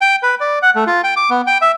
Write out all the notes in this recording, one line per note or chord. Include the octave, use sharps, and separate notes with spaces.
G5
B4
D5
F#5
A3
F4
G5
D6
B3
G5
E5